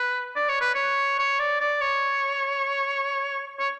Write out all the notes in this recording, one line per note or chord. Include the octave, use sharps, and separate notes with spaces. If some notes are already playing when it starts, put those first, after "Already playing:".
Already playing: B4
D5
C#5
B4
C#5
C#5
D5
D5
C#5
C#5